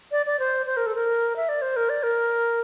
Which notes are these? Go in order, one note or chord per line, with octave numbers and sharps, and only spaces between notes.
D5
D5
C5
C5
A#4
A4
A#4
E5
D5
C5
A#4
D5
A#4